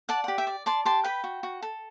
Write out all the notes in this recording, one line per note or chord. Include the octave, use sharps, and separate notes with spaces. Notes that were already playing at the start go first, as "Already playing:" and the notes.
D5 F#5 A5
G4 F#5
E5 G5
D5
D5 A5 C6
G4 A5 C6
B4 G5 B5
F#4
F#4
A4